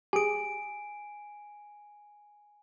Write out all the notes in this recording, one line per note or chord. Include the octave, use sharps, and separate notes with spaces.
G4 G#4 G#5 D7